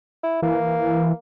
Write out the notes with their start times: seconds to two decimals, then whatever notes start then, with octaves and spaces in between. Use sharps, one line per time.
0.23 E4
0.42 E3 A#3